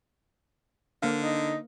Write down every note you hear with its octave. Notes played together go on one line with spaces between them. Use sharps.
D3 A#3 C5 F5
D#4